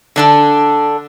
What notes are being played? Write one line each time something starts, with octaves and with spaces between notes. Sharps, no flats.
D3 D4 A4